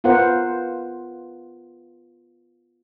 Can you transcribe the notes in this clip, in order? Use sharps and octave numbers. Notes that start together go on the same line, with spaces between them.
B3 F4 A#4 C5 F#5